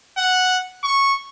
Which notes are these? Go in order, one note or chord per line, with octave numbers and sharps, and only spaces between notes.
F#5
C#6